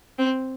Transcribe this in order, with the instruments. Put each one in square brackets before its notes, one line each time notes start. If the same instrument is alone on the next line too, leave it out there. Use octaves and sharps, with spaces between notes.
[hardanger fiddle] C4